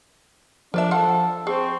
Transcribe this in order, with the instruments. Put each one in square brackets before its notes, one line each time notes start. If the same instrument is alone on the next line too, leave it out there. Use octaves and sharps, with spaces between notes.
[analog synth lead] F3 [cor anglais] D4 [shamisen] A#4 D5 E5
[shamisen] F4 F5 F#5 [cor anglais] A4
[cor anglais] C4 [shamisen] G#4 [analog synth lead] C#6